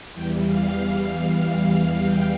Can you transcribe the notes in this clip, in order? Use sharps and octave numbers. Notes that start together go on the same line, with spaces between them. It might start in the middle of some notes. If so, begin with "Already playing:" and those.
E2 E3 G3 G5
F5
F5
F5
G5